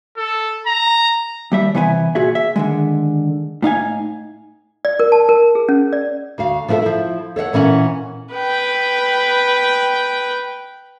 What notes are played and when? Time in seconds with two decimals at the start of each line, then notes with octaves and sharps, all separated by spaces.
0.17 A4
0.67 A#5
1.52 D#2 G3 E5
1.75 C3 E3 B3 E4 D5 G#5
2.15 A#2 F#4 G#4 E5
2.35 E5
2.56 D3 D#3 G#3
3.62 A2 D#4 F5 G#5
4.85 D5
5.00 A#4
5.12 A5
5.29 A#4
5.55 G#4
5.69 C#4
5.93 D5
6.38 D2 F#4 F5
6.68 F3 B3 E4 F4 A4 E5
6.82 F3 E4
7.36 A4 C#5 E5 F#5
7.53 A#2 E3 C#4 D#5 F#5
8.34 B4 G5